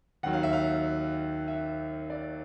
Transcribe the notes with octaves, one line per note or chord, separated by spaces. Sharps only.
D#2 D#3 F#3 F#5
F5
E5
F5
E5
D5